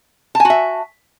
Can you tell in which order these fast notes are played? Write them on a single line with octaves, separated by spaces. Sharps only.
A5 G#5 F#4 E5